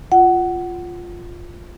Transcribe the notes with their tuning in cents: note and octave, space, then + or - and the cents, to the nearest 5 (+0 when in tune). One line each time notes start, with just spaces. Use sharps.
F4 +0 F#5 +15